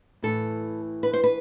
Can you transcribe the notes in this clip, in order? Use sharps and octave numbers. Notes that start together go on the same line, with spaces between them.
A2 E3 A4
B4
C5
B4